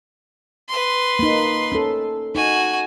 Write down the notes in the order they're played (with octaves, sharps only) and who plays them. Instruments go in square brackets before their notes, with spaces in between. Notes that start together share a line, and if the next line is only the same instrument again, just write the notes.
[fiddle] B4 C6
[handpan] A#3 D#4
C#4 A4
[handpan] D#4 [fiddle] F#4 G#5